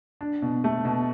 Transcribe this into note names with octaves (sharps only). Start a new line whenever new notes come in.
D4
B2
A3
B2